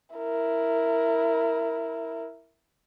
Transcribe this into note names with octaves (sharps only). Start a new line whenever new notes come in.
E4 A#4